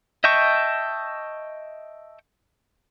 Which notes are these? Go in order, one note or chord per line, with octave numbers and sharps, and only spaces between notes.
D#5 E5 G5 A5 C#6